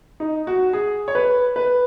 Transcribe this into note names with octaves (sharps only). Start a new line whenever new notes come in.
D#4
F#4
G#4
C#5
B4
B4